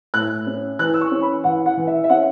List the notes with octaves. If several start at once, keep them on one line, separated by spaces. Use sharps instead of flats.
A2 F#6
C#4
E3 F#6
E6
C#6
C#4
B5
E3 F#5
F#5
E3
E5
E5
C#4 F#5